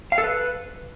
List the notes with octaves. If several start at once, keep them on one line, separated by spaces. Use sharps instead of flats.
F5
A4
B4